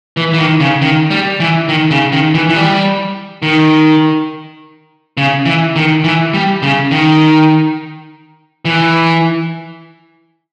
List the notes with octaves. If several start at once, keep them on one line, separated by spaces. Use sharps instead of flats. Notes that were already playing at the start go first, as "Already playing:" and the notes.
E3
E3
D#3
C#3
D#3
G3
E3
D#3
C#3
D#3
E3
E3
G3
D#3
C#3
E3
D#3
E3
G3
C#3
D#3
E3